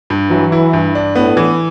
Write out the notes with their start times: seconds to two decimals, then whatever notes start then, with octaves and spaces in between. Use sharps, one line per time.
0.10 G2
0.31 E3 F#3
0.52 E4
0.73 G2
0.95 D4
1.15 A2 B3
1.37 E3